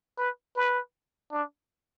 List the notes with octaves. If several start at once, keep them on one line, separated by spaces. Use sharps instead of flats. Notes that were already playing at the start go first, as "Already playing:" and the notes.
B4
B4
D4